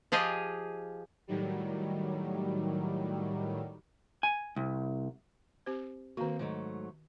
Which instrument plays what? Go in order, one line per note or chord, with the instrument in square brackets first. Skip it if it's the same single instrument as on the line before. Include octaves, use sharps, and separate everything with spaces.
[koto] F3 F4 G4 G#4 D#5
[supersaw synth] A2 D#3 F#3 G3
[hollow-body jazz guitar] G#5
C2
[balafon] C4 G4 C5
[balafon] D#3 F#4 [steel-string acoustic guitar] A#3 C4
[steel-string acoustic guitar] G#2 F#3 A3